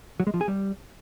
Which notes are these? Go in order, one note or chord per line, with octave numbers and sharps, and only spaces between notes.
F#3
G#3
F3
G#4
G3